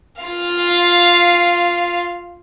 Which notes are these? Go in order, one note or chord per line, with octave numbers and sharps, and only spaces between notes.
F4 F5